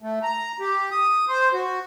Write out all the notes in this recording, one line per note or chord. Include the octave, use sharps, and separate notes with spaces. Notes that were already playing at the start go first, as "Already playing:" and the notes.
A3
A#5
G4
D#6
C5
F#4